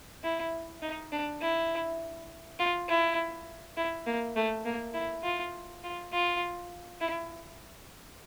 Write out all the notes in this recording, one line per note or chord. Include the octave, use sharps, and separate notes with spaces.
E4
D#4
D4
E4
F4
E4
E4
A#3
A3
A#3
E4
F4
F4
F4
E4